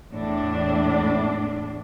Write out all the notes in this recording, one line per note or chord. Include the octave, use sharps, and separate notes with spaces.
E2 A2 D4